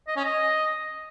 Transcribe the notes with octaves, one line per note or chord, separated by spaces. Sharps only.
D#5
C#4
D#5